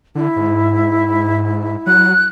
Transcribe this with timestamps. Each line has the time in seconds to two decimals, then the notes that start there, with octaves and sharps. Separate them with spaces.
0.15 D3 E4
0.36 G#2
1.86 F#3 F#6